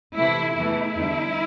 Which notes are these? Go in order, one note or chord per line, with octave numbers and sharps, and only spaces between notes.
C3 E3 A3 E4
E2 E3 A3 E4
E2 D3 G3